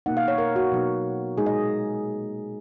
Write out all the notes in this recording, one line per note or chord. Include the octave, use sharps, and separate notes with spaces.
B2 A#3 D#4 F#5
F5
C#5
A#4
F#4
B2 F#3 B3 D#4
A#2 G#3 D#4 G#4
D#5